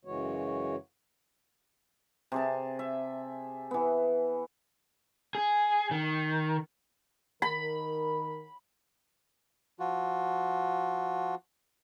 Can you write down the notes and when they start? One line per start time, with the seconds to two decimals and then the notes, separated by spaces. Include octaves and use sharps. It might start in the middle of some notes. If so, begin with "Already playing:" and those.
0.05 F#2 C#3 E3 G#3 F#4 C#5
2.32 C3 G#4 A5
2.79 E5
3.71 E3 B3
5.35 G#4
5.91 D#3
7.42 D#3 A#4 B5
9.80 F3 F4 F#4